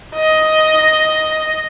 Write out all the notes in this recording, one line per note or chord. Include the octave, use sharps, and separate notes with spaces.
D#5